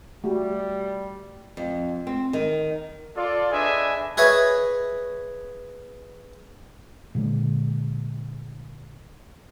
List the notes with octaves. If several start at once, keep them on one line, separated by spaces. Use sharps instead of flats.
G3 A3 F#4 G4
F2
C4
D#3
F4 A4 D5
D4 G#4 B4 D#5 E5 G#5
G#4 B4 C#5 D#5 E5
A#2 D3 G#3